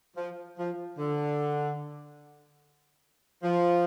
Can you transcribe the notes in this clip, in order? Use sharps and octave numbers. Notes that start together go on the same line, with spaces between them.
F3
F3
D3
F3